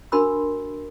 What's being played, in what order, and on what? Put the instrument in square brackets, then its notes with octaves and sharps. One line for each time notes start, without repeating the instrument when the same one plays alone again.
[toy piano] D4 F#4 A#4 B5 C6 E6